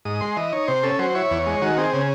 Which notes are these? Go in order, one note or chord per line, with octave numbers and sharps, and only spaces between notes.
G#2 D#6
G#3 C6
E3 D#5
D#4 C#5
C3 C5
C#4 A4
F#3 C5
E4 C#5
E2
G#3
D#3 F#4
C4 G#4
C#3